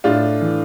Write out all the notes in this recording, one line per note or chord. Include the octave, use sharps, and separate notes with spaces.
A2 D4 F4
E3